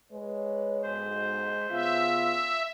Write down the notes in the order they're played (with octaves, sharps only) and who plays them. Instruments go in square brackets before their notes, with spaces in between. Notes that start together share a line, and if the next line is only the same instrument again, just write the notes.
[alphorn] G#3 [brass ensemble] B4 C#5
[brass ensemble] B1 G#2 [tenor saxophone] C5
[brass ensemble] C#3 B3 [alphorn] F4 [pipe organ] E5